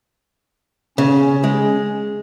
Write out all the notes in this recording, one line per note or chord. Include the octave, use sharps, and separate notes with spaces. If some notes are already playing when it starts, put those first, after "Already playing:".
C#3 C#4
G#3